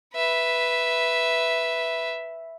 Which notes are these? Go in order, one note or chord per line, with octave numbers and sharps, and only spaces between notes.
B4 E5